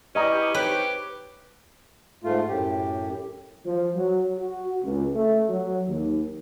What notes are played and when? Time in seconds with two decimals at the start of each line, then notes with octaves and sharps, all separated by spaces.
0.15 B3 C#4 E4 G4 D5 D#5 A#5
0.54 C4 D#4 G4 B4 C#5
2.24 G#2 A3 F4
2.48 F#2 A2 G4
3.66 F3
3.96 F#3
4.39 F#4
4.84 C#2
5.14 A3
5.49 F#3
5.88 D#2